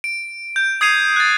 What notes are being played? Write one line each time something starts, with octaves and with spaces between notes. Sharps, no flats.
D7
G6
D#6 G#6 C7 D#7 F7
F#6 A6